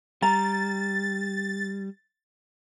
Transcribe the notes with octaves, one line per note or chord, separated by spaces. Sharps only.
G3 A#5 A6